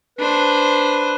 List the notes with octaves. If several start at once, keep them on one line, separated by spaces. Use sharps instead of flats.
D4 B4 C5